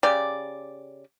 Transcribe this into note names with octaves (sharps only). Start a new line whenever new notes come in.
C#3 G4 D5